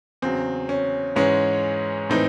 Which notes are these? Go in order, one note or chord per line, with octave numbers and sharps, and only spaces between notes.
E2 C#3 F#3 C4
C#4
G#2 E3 G#3 C#4
A2 E3 C4 D#4